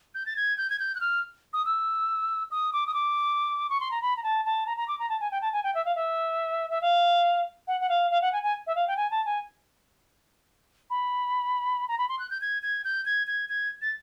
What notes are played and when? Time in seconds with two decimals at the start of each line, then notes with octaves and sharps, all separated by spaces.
0.15 G6
0.26 A6
0.36 G#6
0.58 G6
0.70 G#6
0.80 G6
0.95 F#6
1.01 F6
1.53 D#6
1.66 E6
2.51 D#6
2.73 D6
2.87 D#6
2.94 D6
3.70 C#6
3.80 C6
3.91 A#5
4.02 B5
4.17 A#5
4.23 A5
4.45 A5
4.67 A#5
4.77 A#5
4.88 D6
4.99 A#5
5.09 A5
5.20 G#5
5.31 G5
5.41 A5
5.53 G#5
5.64 G5
5.75 E5
5.85 F5
5.96 E5
6.70 E5
6.82 F5
7.68 F#5
7.81 F#5
7.89 F5
8.11 F5
8.22 F#5
8.33 G#5
8.43 G#5
8.67 E5
8.76 F5
8.88 G5
8.97 G#5
9.11 A5
9.26 G#5
10.90 B5
11.88 A#5
11.98 B5
12.09 C6
12.19 F#6
12.31 G6
12.41 G#6
12.63 G#6
12.84 G6
13.06 G#6
13.27 G#6
13.49 G#6
13.82 A6